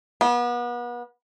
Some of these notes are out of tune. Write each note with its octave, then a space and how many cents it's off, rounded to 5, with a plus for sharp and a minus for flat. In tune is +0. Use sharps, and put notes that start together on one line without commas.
B3 -35